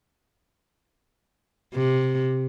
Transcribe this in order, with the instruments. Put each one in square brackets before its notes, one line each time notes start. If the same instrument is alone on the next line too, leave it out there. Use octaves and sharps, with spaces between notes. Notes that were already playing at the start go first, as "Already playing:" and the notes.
[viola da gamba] C3